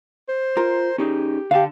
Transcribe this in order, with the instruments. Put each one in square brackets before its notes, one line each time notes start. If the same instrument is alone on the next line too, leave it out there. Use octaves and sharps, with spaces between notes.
[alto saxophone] C5
[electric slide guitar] F4 [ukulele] A#4
[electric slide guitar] C#4 D#4 G#4 [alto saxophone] G4
[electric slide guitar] D3 A5 [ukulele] G4 F5